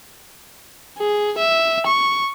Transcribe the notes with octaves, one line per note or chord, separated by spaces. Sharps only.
G#4
E5
C#6